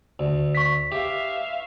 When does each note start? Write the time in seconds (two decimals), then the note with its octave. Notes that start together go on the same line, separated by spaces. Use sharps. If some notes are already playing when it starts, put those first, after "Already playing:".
0.19 D2
0.55 C#6 B6
0.92 G4 E5 F5